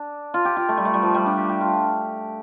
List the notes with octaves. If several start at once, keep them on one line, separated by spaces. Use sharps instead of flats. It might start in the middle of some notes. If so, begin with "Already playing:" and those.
Already playing: D4
F4
G4
F4
A3
G3
A3
G3
F3
G3
D4
G4
G4
F4